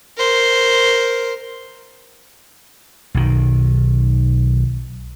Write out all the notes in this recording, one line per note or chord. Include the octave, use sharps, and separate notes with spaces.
A#4 C5
B1 D#3